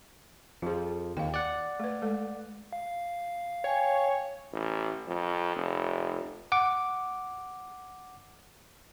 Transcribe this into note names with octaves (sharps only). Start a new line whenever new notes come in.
F2 F3 F4 G#4
D#2 F5 G5
D5 F#5
A3 B4
G#3 A4
F5
C#5 G5 G#5
A1
F2
F1
F#5 D6